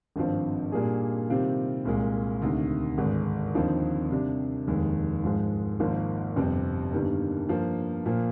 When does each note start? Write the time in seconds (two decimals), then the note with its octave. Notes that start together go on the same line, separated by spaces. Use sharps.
0.16 G#1 G2 F3 C4
0.72 A#2 G3 A#3 D4 G#4
1.30 C3 D#3 G3 C4 F4
1.85 C2 A#2 G#3
2.42 D2 C3 D#3
2.98 G#1 G2 D3 G#3
3.54 D#2 D3 F3 C4 D#4
4.11 C3 G3 D4
4.67 F1 D#2 D#3 G#3
5.24 G#2 F3 G#3
5.80 G#1 G#2 F3 A#3
6.36 G1 F2 C3 G3 C4
6.93 G1 G2 D#3 G3 A#3
7.48 G2 F3 A#3
8.06 A#2 F3 A#3